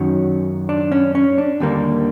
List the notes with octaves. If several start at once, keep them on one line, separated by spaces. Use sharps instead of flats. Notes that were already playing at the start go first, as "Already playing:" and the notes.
Already playing: F#2 D#3 F#3 C#4
D4
C#4
C#4
D4
D#2 D3 G3 A#3